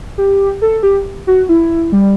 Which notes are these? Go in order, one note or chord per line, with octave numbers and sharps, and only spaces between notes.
G4
A4
G4
F#4
E4
G3